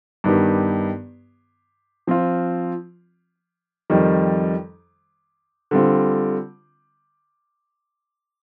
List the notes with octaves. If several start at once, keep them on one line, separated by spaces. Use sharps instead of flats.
G2 D#3 B3 D#4 G4
F3 C4 F4
F2 D#3 G3
D3 G3 C4 F4